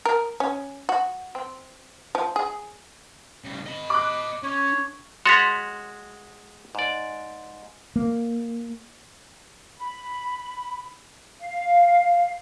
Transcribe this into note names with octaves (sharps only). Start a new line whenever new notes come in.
A#4
C#4
F#4
C4
F3
G#4
C#3 G3
D#5 B5
D6 F#6
C#4 C#5
G#3 F#4 C#5 C6 A6 B6
G#2 D5
A#3
B5
F5